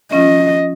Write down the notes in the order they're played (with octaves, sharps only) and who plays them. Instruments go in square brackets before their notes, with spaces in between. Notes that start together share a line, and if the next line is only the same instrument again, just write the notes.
[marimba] F3 C#4 F4 [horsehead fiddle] D#5